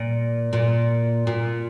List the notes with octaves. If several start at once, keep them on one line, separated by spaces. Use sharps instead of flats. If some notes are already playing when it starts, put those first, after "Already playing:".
Already playing: A#2
A#2
A#2